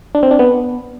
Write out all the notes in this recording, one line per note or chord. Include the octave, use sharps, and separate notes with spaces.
D4
C4
D4
B3